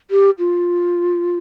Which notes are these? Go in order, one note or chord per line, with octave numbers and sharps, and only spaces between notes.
G4
F4